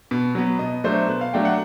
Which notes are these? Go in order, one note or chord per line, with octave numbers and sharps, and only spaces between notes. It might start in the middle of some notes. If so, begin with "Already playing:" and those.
B2
F#3 B3
B2 D#5
F#3 A3 D4 C5
B2 B4
F5
F#3 A3 D4 G5
F#5